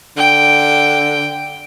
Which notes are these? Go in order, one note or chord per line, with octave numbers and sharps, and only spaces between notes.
D3 G5